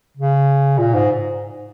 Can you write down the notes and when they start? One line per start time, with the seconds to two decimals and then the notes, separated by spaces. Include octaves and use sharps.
0.17 C#3
0.78 A#2
0.94 G#2